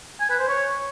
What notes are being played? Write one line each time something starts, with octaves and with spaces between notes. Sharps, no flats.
G#5
B4
C5
C#5